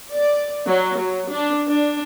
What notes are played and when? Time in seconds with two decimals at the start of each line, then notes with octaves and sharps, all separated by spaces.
0.11 D5
0.68 F#3
0.98 F#3
1.31 D4
1.67 D4